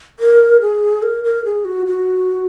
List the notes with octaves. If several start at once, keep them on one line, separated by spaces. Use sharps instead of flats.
A#4
G#4
A#4
A#4
G#4
F#4
F#4